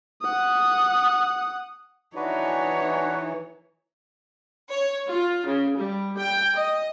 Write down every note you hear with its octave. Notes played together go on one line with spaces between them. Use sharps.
F#5 D#6
E3 D4 D#4 F#4 B4 C#5
C#5
F4
C#3
G3
G5
D#5